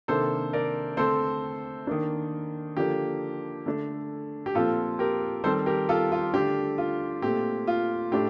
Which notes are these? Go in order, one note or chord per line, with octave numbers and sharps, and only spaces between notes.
C3 D#3 A#3 D4 A4 C5
A#4 D5
D3 A3 C4 A4 C5
D#3 A#3 D4
D3 F3 A#3 D4 G4
D3 A3 D4
G4
A#2 F3 C4 F4 A4
G4 A#4
D#3 G3 C4 A4 C5
G4 A#4
F4 A4
F4
D3 A3 D4 G4
F4
A#2 A3 C4 G4
F4
A2 A3 D4 G4